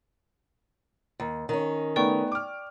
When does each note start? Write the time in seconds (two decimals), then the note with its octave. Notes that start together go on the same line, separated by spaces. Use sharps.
1.20 D#2
1.49 D#3 C#4
1.96 A3 B3 D#4 D5 G5 C#6
2.32 D6 F6